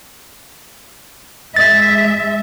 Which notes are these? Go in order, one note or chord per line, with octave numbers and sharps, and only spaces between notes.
G#3 E5 A6